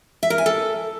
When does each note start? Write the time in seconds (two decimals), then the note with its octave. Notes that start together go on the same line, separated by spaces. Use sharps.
0.23 E5
0.30 A#4
0.38 G#5
0.46 A4